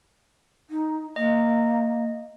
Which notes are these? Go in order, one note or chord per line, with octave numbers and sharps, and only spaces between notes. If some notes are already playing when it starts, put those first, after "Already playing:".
D#4
A#3 D#5